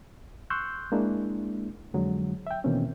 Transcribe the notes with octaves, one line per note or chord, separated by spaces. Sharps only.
C6 C#6 E6 F#6 G6
G#3 A#3 D4 E4
F2 D3 F#3 G#3
E5 G5
B2 D#3 E3 A#3 C4 C#4